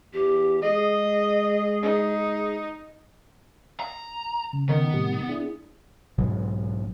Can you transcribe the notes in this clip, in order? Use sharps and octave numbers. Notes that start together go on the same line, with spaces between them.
E2 G4
G#3 G#4 D#5
D#4
A#5
C#3
D#3 B3
A2 C3 G3
D4 E4 G#4
B1 G#2 B2 F#3